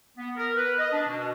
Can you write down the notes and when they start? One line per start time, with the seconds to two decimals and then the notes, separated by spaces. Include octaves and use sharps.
0.17 B3
0.37 A#4
0.56 B4
0.79 D#5
0.93 D4
1.08 B2